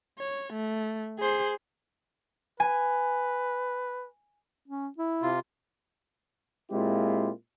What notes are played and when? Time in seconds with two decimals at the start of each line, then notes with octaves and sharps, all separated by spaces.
0.19 C#5
0.53 A3
1.19 G#4 C5
2.60 B4 G#5
4.68 C#4
4.98 E4
5.22 C3 F4
6.71 A#2 G#3 C4 E4 F4 G4